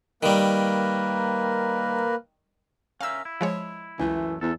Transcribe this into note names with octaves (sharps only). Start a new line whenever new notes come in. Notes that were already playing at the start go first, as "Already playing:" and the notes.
D#3 G3 A#3 A#4 B4
C#4 A#4 E5 F5 E6
E4
F3 G#3 C#5
C#2 F#2 E3 A3
E2 A4